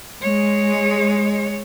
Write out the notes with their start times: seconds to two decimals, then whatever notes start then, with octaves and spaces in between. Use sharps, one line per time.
0.22 G#3 C#5